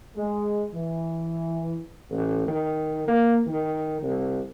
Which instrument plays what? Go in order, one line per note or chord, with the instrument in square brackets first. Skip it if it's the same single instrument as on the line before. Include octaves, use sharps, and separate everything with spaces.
[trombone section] G#3
E3
[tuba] A1
D#3
A#3
D#3
C2